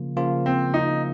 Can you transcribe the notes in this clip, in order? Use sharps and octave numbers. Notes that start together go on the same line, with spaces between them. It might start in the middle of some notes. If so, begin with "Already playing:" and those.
Already playing: C#3 F3 A#3 F4
C#3 F3 A#3 F4
C4
D#4